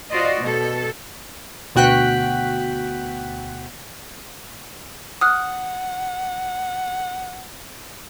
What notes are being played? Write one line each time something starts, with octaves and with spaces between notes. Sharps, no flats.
F4 F#4 C5 D5 D#5
B2 A4
D2 B2 F#4 G5 F#6 B6
F#5 D#6 F6 F#6